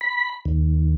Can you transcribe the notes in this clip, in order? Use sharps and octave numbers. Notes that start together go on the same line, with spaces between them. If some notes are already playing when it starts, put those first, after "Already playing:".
B5
D#2